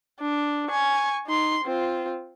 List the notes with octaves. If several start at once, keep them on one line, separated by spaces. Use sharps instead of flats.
D4
G#5 C#6
D#4 C6
C4 F4